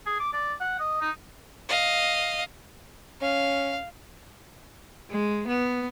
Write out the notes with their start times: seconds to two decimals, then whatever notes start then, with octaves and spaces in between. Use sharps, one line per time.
0.06 G#4
0.20 D6
0.33 D5
0.61 F#5
0.79 D#5
1.01 D#4
1.69 D#5 F5
3.22 C#4 F5
5.10 G#3
5.48 B3